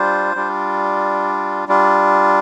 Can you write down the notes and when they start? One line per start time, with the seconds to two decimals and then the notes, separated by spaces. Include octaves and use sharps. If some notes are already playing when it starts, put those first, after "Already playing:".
Already playing: G3 D4 F4 C5
0.35 G3 D4 F4
1.68 G3 D4 F4